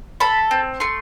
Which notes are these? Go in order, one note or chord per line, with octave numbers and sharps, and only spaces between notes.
A4 B5
C4
A3 C6